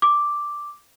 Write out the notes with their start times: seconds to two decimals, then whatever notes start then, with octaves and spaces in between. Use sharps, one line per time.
0.02 D6